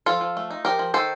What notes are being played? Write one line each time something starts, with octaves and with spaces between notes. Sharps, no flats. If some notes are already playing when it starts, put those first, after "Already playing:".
F3 F4 A4
F3
A3
D#4
F3 G4 A#4
F3
D#3 A4 C5